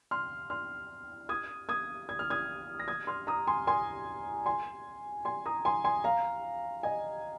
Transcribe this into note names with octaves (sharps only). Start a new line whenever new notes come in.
C6 F6
C6 F6
D#6 G#6
D#6 G#6
G#6
F6
D#6 G#6
A#6
D#6 G#6
C6 F6
A#5 D#6
G#5 C6
G#5 C6
G#5 C6
G#5 C6
A#5 D#6
G#5 C6
G#5 C6
F5 A#5
D#5 G#5